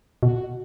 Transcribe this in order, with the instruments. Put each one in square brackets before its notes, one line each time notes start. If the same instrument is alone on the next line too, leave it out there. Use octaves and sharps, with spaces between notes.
[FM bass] B2 [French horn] F#4